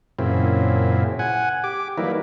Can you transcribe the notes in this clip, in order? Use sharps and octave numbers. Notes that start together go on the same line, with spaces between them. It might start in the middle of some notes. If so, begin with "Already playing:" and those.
F#2 A#2 C#3 C4 E4
F#5 G#5
G4 D6
E3 F#3 G3 A#3 D#4 E4